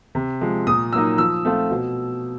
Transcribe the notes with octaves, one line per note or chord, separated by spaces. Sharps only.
C3
F3 G#3
A#2 D#6
F#3 A#3 D#4 E6
F3 E6
A3 C4 F4
B2